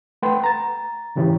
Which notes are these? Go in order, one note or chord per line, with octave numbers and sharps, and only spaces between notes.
A3 B4 F#5 G5 C6
A#5 A6
G#2 C#3 E3 G4 C#5